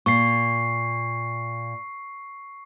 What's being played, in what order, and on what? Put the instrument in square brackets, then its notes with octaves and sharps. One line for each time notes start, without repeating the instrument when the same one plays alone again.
[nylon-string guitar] A#2 [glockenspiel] C#6 C7